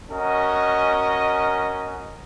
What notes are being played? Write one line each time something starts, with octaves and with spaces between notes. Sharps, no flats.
C#4 F#4 A#4 D#5